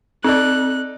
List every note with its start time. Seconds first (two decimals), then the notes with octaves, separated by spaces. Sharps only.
0.24 C4 D#4 A4 D5 F#6